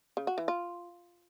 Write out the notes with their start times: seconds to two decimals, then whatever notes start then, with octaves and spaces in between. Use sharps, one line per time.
0.17 C#3
0.27 F#4
0.38 E3
0.48 F4